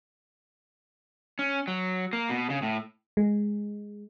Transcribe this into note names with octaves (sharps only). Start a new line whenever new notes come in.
C#4
F#3
A#3
B2
C#3
A2
G#3